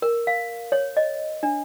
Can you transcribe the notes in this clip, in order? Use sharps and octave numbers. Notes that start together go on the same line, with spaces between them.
A#4
F5
C#5
D#5
D4